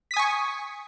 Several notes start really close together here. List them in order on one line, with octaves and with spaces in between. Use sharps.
B6 D#6 G#5 C#6